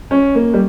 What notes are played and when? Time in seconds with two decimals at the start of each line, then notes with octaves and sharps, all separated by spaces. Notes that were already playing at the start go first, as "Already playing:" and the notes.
0.11 C#4
0.35 A#3
0.54 G3